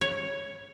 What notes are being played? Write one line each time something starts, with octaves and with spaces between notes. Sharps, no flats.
C#5